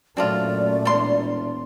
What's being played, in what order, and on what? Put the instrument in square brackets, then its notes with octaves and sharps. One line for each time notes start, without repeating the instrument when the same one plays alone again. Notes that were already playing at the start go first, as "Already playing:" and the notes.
[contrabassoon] F#2 [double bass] A#2 A3 [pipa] C4 D4 F4 [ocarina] D5
[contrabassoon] E1 [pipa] D4 C6